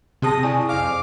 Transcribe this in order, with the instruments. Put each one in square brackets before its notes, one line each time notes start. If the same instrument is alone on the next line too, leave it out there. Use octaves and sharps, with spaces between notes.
[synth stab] C3 D#6 A#6 [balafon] C4 G#4 A5
[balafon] E4 D5 G#5
[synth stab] F2 F6 [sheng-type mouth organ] F5 D6